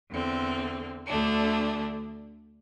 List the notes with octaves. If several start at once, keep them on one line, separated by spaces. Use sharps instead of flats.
E2 D3 C4
D2 D3 A3 D4